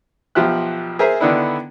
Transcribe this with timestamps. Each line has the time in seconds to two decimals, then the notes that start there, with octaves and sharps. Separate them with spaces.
0.35 B1 F3 G4 E5 F#6
0.99 G#4 A#4 C5 E5 G#5 A#5
1.20 D3 D#3 B3 D4 E4